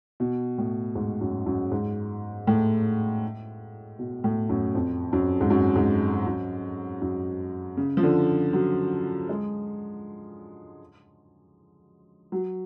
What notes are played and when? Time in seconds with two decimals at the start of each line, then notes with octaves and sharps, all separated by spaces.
0.20 B2
0.58 A2
0.95 G#2
1.21 F#2
1.46 F#2
1.71 G#2
2.47 A2
3.99 B2
4.24 A2
4.49 F#2
4.75 F2
5.13 F#2
5.41 G#2
5.50 F#2
5.76 G#2
6.26 F#2
7.02 F#2
7.77 C#3
7.97 F3
8.03 D3
8.53 F#3
9.29 G#3
12.32 F#3